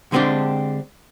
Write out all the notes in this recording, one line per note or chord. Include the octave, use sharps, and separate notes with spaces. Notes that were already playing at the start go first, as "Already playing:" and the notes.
D3 G#3 B3 C4 D4 G4